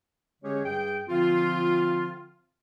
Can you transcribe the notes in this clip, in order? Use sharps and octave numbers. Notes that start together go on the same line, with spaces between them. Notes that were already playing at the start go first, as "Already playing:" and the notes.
D3 G#3 C#4 G4 G#4 C#5
G2 G3 G#4 G5
D3 F3 C4 F4